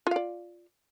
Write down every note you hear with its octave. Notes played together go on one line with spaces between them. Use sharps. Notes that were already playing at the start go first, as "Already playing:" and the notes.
F4 D5 F5